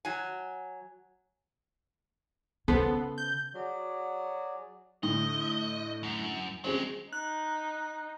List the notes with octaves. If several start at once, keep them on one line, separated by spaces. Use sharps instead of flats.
F#3 G#5
C#3 B3 A4 B4 C5
G6
F#3 F#4 G#4 D5
A2 D3 D#5
F#2
F#3 G#3 C4 C#4 G#4
D#4 F#6